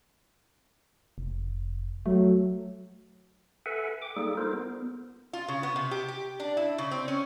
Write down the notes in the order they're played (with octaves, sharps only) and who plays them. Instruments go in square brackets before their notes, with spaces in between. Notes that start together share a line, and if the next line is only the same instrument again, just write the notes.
[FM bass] F1
[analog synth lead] F#3 [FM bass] A3
[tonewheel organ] A4 B4 E5 F#5 G#5
G5 D6
G3 A#3 D#4 G#4 A4
D#4 F4 A4 A#4 C5
B3
[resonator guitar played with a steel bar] F4
C#3
B3
C3
G4
G4
D4
E4
C#3
C4
C#4